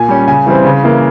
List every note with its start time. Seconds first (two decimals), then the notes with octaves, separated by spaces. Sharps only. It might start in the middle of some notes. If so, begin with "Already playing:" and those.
Already playing: A#2 G#5
0.09 G3 C#4
0.28 C#3 G#5
0.46 E3 G3 C4
0.65 C#3
0.84 E3 A#3